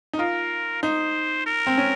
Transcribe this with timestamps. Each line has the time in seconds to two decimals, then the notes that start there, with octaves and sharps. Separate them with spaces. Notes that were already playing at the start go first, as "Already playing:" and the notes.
0.13 D#4
0.19 F4 A#4
0.83 D#4 C5
1.46 A#4
1.67 C4
1.78 C#4